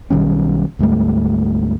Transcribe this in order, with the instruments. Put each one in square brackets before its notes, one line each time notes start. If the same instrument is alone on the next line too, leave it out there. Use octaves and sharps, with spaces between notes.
[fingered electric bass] B1 D#3 G3 C#4
D2 G#2 G3 A3